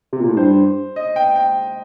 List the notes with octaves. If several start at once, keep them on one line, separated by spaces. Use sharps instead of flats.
C3
A#2
A2
G2 C5
D#5
G5
G5